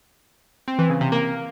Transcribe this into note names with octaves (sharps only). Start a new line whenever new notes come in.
C4
E3
C#3
C3
A#3